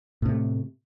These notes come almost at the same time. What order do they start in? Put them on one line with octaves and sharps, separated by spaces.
A2 C3 A3